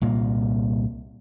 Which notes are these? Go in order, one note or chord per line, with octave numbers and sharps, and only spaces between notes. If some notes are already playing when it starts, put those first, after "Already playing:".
C2 A#2 A#3